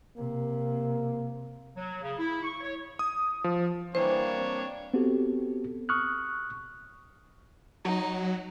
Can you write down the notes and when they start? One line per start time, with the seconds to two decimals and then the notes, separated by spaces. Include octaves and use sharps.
0.18 C3 A#3
1.76 F#3
2.02 C#3
2.19 E4
2.43 C#6
2.60 C#5
2.99 D#6
3.44 F3
3.95 E3 G3 A#3 D4 C5 C#5
4.37 C4
4.94 B3 C4 F#4 G4 A4
5.89 C#6 D#6 F6 F#6
7.85 F#3 D#4